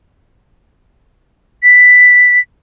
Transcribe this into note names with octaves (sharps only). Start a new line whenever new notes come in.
B6